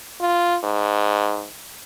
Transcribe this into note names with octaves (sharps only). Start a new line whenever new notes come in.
F4
G#2